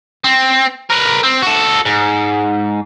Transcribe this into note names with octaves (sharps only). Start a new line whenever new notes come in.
C4
A#4 B4
C4
F#4 A4
G#2